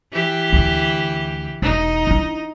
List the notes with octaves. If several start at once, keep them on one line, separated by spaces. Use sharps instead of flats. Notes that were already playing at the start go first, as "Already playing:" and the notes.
E3 G4
D2 D3
E1 D#4
D4 E4